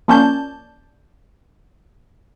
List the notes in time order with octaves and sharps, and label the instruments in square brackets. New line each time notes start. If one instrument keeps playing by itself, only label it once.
[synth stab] F3 A#3 C#4 D5 A5 G6